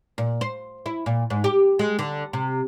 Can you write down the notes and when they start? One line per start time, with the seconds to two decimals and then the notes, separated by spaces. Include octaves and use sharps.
0.18 A#2
0.41 C5
0.86 E4
1.06 A#2
1.30 G#2
1.44 G4
1.79 G#3
1.99 D3
2.33 C3